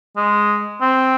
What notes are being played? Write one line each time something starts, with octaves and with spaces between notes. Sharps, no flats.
G#3
C4